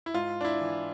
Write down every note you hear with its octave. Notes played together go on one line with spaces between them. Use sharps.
E4
G#2 F4
D4
E4
E3